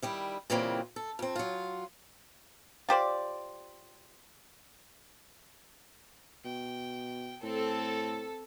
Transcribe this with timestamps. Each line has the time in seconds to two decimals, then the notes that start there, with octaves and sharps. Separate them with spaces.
0.02 D#3 G3 E4
0.50 A#2 C#3 E3 G3 A#3 C4
0.96 A4
1.19 F2 C4
1.36 F#3 F4
2.89 F4 G4 C5 D5
6.45 B2 G5
7.43 A2 C4 A4